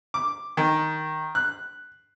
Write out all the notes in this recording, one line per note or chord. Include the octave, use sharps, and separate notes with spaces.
D6
D#3
F#6